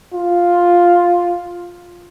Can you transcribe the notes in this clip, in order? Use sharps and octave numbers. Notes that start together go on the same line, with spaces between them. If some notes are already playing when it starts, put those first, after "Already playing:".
F4